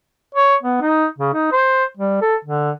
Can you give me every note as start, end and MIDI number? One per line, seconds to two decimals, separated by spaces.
0.35 0.56 73
0.63 0.79 59
0.81 1.06 63
1.19 1.34 49
1.34 1.51 63
1.52 1.85 72
1.97 2.17 55
2.21 2.35 69
2.45 2.71 50